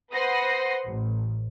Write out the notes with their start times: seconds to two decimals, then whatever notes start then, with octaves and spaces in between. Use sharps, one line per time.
0.12 B4 C5 F#5 C6 D#6 A#6
0.85 A1